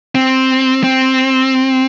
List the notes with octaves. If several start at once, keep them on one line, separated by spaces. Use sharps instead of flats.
C4
C4